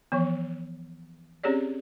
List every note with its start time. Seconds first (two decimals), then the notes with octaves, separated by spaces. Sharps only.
0.12 E3 F3 B3
1.44 C4 C#4 G4 G#4 C#5 D5